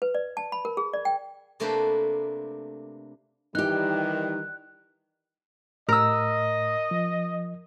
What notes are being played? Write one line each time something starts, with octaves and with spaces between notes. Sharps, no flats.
B4
D5
A5
B5
A#4
G#4
D5
G5
C3 A3 A#3 D4 B4 C5
D#3 E3 G3 D#4 G4 F#6
A2 A#4 D#5 E6
F3